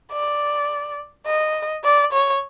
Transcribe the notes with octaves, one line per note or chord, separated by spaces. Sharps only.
D5
D#5
D5
C#5